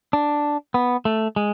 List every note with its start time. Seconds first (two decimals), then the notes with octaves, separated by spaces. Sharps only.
0.13 D4
0.74 B3
1.05 A3
1.36 G#3